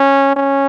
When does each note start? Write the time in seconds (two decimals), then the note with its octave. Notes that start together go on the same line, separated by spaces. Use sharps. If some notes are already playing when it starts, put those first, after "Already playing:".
Already playing: C#4
0.36 C#4